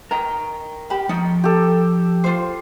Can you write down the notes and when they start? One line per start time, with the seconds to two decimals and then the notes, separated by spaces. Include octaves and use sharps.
0.11 A#4 D#5 G5 A#5
0.90 G4 B5
1.09 F3 D#4 G5
1.44 G4 A4
2.24 F4 C5